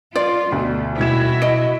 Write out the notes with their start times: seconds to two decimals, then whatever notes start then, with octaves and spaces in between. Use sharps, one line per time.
0.16 F4 D5 C6
0.52 D2 B2 A3
0.99 D#1 B2 E4 F#4 G#6 E7
1.42 D#5 D7